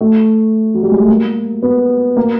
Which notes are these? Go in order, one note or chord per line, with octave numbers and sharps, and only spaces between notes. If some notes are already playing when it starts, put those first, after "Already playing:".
A3
F#3
G3
G#3
A3
A#3
B3
A#3